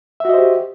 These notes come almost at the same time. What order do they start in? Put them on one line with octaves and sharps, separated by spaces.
E5 F#4 D#5 C5 G4